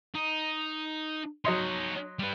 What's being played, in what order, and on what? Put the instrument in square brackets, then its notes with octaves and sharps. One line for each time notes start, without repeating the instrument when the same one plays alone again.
[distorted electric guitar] D#4
[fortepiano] F#3 D#5 C6 [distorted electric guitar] D#4 C#5
[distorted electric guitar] G3 B4